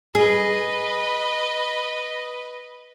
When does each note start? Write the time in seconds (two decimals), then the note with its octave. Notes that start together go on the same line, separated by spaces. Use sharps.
0.15 G#4 B4 D#5